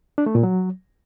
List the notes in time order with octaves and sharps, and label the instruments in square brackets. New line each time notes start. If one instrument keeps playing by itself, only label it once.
[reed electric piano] D4
A3
A#2
F#3